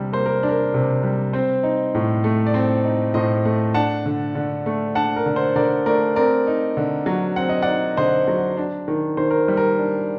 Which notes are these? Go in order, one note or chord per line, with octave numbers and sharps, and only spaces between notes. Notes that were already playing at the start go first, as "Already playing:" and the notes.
Already playing: C3 G3 D4
A#3 C5
A#4
D4
A#4
C3
G3
C4 C5
D#4
A2
A3
D5
C4 C5
D#4
A2 C5 D#5
A3
D4 F#5 A5
D3
D3
A3
D4 F#5 A5
A#4
D3
C5
D3 A#4 D5
A3 A#4 D5
C4 A#4 D5
D#4
D3
F#3
C4 F#5
D#5
D#4 D5 F#5
D3 C5 D#5
F#3
D4
D#3
D#3 C5
A#4
G3
A#4
D4